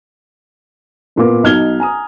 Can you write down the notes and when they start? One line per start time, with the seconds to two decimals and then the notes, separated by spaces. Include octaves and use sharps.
1.16 A1 A#2 B3 D6
1.44 B1 D#4 F6 G#6 G7
1.80 G#5 A#5 D#6